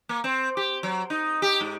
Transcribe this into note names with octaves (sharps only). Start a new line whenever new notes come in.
A#3
C4
G4
F#3
D#4
G4
G#2